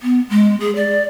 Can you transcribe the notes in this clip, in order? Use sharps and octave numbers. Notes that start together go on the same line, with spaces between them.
B3
G#3
G#4
D5